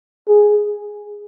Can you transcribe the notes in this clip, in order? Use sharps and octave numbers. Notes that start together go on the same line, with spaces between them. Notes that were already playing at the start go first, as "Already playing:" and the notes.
G#4